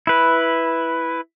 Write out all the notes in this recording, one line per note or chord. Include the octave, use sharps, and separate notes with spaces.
E4 B4